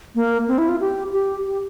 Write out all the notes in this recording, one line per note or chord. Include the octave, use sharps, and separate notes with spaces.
A#3
C4
E4
F4
G4
G4
G4